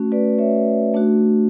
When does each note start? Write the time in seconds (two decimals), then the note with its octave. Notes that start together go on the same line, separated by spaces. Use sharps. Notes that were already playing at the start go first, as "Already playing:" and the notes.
Already playing: A3 C#4 F#4
0.12 B4 D5
0.38 C#5 E5
0.94 A3 D4 F#4